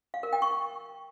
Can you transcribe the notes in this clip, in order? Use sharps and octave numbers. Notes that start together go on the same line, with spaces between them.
F5
A#4
G5
C#6